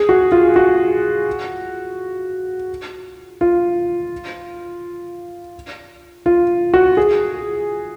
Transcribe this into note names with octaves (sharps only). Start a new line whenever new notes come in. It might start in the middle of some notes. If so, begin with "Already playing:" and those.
Already playing: G#4
F#4
F4
F#4
F4
F4
F#4
G#4